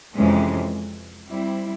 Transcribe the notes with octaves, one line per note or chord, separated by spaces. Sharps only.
F2 C3 E3 G#3 C#4
G3 C4 E4